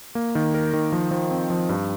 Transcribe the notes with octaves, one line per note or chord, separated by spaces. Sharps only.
A#3
D#3
A#4
D#3
F3
F3
C4
F3
G2